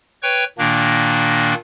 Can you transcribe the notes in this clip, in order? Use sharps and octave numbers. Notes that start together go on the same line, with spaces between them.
B4 C#5 G5 C#6
A#2 D#3 A#3 D4